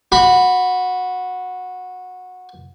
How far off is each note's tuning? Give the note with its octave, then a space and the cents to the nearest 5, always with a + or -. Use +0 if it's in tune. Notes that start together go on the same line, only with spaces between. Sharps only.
F#4 -15 B5 +0